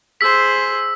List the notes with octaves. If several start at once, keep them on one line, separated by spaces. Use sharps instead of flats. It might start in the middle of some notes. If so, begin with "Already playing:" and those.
G#4 C5 E6 B6